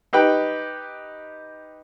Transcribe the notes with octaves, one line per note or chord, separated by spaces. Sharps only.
D#4 G4 B4 G5